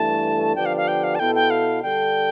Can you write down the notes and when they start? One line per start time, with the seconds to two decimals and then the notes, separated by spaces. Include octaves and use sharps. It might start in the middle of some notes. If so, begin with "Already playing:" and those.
Already playing: G2 E3 A3 A5
0.55 D3 F3 B3 D4 G4 G5
0.66 F5
0.77 F5
0.88 G5
1.04 F5
1.15 A5
1.19 B2 B3 E4 A4 G5
1.35 G5
1.50 F5
1.82 D3 G3 D4 A4 G5